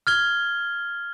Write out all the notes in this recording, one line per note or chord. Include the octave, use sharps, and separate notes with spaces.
F6 G#6 G7